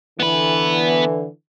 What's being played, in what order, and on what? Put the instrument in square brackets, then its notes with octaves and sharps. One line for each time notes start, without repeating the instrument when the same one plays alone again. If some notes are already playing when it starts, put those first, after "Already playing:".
[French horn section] D3 E3 [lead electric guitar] B3 B4